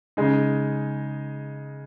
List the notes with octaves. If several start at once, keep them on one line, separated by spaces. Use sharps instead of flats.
C#3 G#3 D#4